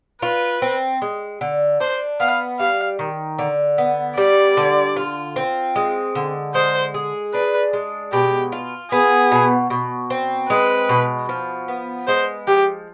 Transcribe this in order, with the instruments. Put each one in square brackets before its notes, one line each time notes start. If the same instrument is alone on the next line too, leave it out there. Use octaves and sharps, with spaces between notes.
[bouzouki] F4 [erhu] B4
[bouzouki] C4
G#3
D3
[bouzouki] D4 [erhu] C5
[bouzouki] B3 [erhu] F5
[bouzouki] G3 [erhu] F5
[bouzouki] D#3
D3
B3
[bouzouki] G3 [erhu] D5
[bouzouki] D3
F4
C4
G#3
D3
[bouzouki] G#3 [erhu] C5
[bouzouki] G#4
[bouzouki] D4 [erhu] B4
[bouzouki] G#3
[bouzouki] B2 [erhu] G4
[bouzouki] F4
[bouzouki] B3 [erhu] G#4
[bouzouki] B2
B2
C4
[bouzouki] G#3 [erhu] B4
[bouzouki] B2
F3
B3
[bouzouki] G#3 [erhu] C5
[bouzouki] F3 [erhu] G4